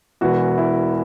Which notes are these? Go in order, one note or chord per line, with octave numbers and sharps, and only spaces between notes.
E1 E2 E3 F#4
E4